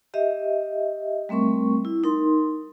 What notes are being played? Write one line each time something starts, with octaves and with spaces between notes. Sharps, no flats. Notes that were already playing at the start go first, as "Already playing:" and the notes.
G4 D#5 E5
G3 A3 C4 A#4 C#6
E4
D#4 A#4 C6